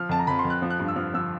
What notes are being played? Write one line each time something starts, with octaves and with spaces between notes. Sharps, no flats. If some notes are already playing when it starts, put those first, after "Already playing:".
Already playing: F3 F6
F2 A5
A#5
F2 B5
C6
F2
F#6
F3
F#6
G2
E6
F3 F6
F3 E6